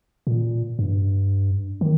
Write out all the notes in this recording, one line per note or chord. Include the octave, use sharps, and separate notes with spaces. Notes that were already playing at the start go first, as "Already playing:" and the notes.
A#2
G2
D#3